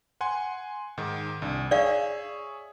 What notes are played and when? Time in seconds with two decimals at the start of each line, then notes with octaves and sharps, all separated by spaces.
0.21 F#5 G#5 C6
0.97 G#2 D#3
1.42 C2 D4
1.71 G#4 C#5 D5 E5 F5